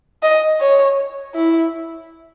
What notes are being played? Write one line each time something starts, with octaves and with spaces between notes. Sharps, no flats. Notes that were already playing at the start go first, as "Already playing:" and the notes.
D#5
C#5
E4